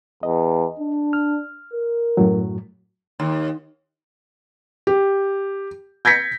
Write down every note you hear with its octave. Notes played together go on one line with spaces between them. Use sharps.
E2 D#5
D4
F6
A#4
F#2 A2 F#3
D#2
G4
G6 G#6 A#6 B6 C#7